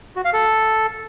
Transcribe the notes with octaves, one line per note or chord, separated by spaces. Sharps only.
F#4
F5
A4